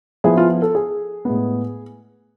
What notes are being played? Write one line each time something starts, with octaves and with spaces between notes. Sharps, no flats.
F3 B3 E4 G#4
F4
A4
G#4
A2 G#3 B3